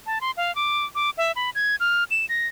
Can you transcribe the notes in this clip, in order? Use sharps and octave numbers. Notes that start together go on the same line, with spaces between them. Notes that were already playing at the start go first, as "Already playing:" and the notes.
A5
C6
F5
D6
D6
E5
B5
G#6
F6
E7
A#6